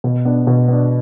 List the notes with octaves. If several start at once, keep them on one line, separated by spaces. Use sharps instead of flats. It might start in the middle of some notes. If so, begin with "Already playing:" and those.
B2
B3 D4
B2
B3 D4